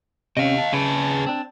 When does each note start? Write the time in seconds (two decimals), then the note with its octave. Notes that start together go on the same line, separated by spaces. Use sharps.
0.37 C3 C#4 D#5 F5
0.58 A5
0.73 C#3 G#4 B4 A5
1.27 C4 D4